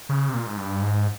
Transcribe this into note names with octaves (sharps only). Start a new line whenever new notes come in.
C#3
C3
A#2
G#2
G2
G#2